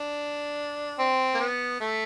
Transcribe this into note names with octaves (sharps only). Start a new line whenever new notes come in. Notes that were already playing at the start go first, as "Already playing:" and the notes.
Already playing: D4
C4
A#3
B3
A3